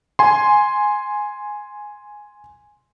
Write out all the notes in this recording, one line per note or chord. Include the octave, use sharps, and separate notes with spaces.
G#5 C6